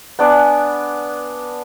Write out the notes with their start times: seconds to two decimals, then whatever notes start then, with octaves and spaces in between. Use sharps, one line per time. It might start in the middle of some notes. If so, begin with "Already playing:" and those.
0.19 B3 D4 D5 G#5